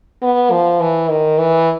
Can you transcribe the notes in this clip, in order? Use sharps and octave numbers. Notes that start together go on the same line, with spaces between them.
B3
F3
E3
D#3
E3